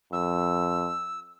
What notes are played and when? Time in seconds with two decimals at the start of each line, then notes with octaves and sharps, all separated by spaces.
0.13 F2 E6